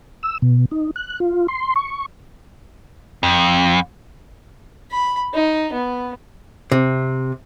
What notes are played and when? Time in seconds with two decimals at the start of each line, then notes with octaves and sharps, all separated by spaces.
0.23 E6
0.42 B2
0.71 D#4
0.96 F#6
1.20 F4
1.48 C6
1.76 C#6
3.23 F2
4.91 B5
5.34 D#4
5.73 B3
6.72 C3